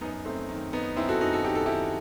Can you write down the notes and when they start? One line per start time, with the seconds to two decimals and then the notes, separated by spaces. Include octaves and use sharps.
0.01 F#2 B3 D#4
0.25 F#2 A3 C4
0.49 D#3
0.73 D#3 B3 D#4
0.96 F#2 C4 E4
1.09 F#4 A4
1.21 F#2 D#4 F#4
1.33 F#4 A4
1.44 D#3 G4
1.55 A4
1.66 D#3 E4 G4